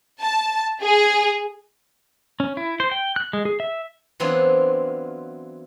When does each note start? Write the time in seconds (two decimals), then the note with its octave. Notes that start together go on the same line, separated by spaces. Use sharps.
0.21 A5
0.82 G#4
2.40 C#4
2.57 E4
2.80 C5
2.91 G5
3.16 F#6
3.33 G#3
3.45 G#4
3.60 E5
4.20 E3 F#3 B3 C4 D4 F4